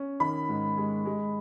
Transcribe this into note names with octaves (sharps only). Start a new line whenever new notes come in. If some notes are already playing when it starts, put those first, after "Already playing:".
Already playing: C#4
D#3 B5
G#2
G#3
G#3